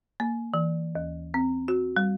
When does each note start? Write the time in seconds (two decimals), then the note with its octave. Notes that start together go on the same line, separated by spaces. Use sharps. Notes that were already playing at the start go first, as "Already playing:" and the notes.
0.20 A#3
0.54 E3
0.95 D#2
1.34 C4
1.68 F#4
1.97 G3